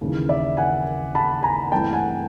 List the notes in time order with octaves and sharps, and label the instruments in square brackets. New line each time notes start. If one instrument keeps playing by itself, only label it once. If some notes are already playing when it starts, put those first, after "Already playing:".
[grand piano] D#2 C#3 E3
D5 E5
F#5 G#5
A5 B5
G#5 A#5
G2 E3 A3 C4 G5 A5
F#5 G#5